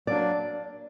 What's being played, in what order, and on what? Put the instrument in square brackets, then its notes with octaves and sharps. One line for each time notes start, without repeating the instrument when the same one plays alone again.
[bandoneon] F#3 A#3 D4 [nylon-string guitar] D5